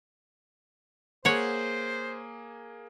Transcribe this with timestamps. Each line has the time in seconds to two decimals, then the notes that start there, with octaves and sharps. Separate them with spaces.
1.25 A#3 G#4 C5 C#5 F#5